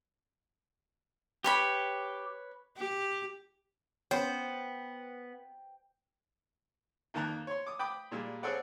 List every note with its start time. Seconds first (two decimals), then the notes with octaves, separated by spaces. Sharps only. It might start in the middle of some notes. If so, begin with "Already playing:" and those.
1.44 G4 B4 C#5 B5
2.78 G4
4.11 B3 C#4 C5 G5
7.14 F2 D#3 A#3 A5 A#5 F#6
7.47 C#5 C6
7.66 D6 D#6
7.79 G5 B5 D6 D#6
8.11 A#2 G3 G#3
8.43 C4 G#4 A4 C#5 D5 F#5